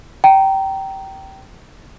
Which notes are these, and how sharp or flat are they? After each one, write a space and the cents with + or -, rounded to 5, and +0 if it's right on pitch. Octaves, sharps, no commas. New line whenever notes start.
G5 -20 A#5 +0